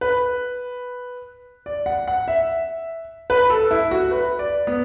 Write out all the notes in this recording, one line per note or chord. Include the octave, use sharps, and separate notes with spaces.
B4
D5
F#5
F#5
E5
B4
A4
E4
F#4
B4
D5
B3